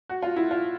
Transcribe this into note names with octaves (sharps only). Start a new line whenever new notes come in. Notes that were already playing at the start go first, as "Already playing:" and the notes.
F#4
F4
E4
F4